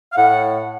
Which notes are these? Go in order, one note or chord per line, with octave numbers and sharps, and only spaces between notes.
F5
A2 F#5